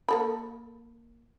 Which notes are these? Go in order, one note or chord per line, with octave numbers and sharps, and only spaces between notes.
A#3 A4 B5